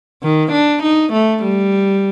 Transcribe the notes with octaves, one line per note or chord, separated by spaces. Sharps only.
D#3
D4
D#4
A3
G3